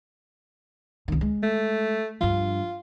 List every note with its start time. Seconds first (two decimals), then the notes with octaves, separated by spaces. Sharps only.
1.08 C2 D#3
1.21 G#3
1.43 A3
2.21 G2 F3 F4